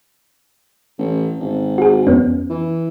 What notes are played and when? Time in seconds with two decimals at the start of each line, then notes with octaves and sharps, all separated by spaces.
0.99 A1
1.40 G#1
1.78 F#4 G#4
2.07 F2 B3 C#4
2.50 E3